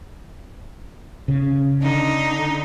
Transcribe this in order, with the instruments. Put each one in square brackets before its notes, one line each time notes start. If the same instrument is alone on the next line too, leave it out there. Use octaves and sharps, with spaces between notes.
[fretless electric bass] C#3
[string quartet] D3 D#4